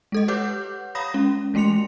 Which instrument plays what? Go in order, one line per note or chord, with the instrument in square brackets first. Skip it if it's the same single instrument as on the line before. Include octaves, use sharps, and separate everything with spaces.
[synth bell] G#3 A4 D#5
G4 B4 C#5 F#5 D6 G6
C#5 F5 A#5 B5 D#6 A#6
G#3 C#4
E3 G#3 A3 C6 C#7 F7